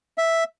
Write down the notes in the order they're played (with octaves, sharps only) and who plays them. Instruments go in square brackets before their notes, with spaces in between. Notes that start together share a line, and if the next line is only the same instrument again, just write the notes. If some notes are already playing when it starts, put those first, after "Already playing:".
[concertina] E5